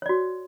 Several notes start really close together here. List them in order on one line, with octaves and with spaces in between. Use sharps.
C#5 D5 F#4